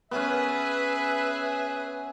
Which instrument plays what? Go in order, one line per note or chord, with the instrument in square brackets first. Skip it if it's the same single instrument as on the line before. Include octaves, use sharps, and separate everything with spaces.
[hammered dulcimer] B3 C#4 [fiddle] G#4 [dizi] B4 [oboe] E5